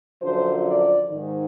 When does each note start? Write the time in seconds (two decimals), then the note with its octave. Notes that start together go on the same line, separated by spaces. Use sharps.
0.22 F#2 D3 F3 C5
0.66 D5
1.09 G#2 D#3